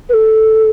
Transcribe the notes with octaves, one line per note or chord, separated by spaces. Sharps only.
B4
A4